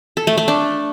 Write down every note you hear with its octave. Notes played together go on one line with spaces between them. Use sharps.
A4
A3
A3
D4